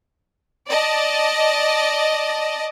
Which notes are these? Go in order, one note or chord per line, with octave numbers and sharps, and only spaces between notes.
D5 D#5 A5